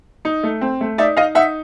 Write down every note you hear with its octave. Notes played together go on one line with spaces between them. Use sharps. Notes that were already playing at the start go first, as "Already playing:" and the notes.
D#4
A3
C4
A3
D#4 D5 E5
D#4 D#5 F5
D#4 E5 F#5